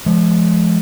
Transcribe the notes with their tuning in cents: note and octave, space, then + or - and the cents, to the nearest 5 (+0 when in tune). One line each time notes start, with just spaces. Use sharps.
F3 -25 G#3 +35